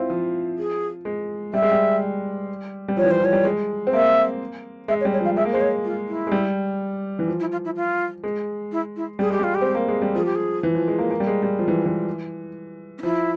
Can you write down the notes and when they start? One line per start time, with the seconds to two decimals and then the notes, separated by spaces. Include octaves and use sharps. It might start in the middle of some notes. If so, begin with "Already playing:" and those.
Already playing: C4 E4 F4
0.10 F3
0.58 G#4
1.05 G#3
1.53 G3 E5
1.62 G#3
1.71 G3
2.88 G3
2.97 F3 C#5
3.04 E3
3.09 F3 C5
3.20 F3 C#5
3.33 G3
3.45 G#3
3.87 C4
3.93 A#3 E5
4.88 G#3 E5
5.00 C#5
5.05 G3
5.13 C#5
5.21 F3 F5
5.36 G#3 E5
5.45 A#3
5.52 G#3 C5
5.60 C#5
5.84 F4
6.08 E4
6.27 G#3
6.32 G3
7.19 E3
7.28 F3
7.40 E4
7.51 F4
7.64 E4
7.76 F4
8.24 G#3
8.71 E4
8.96 E4
9.19 G3 G#4
9.30 G#3 G4
9.40 G3 F4
9.54 G4
9.61 C4
9.75 A#3
9.88 G#3
10.02 G3
10.15 F3 G#4
10.25 G4
10.35 G#4
10.63 E3
10.75 F3
10.88 G#3
10.98 A#3
11.11 A#3
11.20 G3
11.27 G#3
11.43 G3
11.59 F3
11.68 E3
11.86 E3
12.98 C#4
13.02 F3 E4